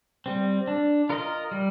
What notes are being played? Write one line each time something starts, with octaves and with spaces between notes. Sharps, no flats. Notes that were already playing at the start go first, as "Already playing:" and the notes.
G3 C4
D4
F4 A#4 D#5
G3